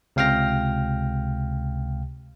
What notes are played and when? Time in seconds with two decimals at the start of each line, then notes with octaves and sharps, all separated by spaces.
0.16 C#2 C3 F5 G5 F6 A#6